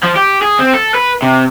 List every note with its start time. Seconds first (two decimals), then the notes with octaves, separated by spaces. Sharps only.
0.03 F3
0.16 G4
0.42 G#4
0.59 C4
0.74 A4
0.94 B4
1.22 C3